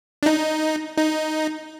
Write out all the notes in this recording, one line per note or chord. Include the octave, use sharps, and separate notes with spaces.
D4
D#4
D#4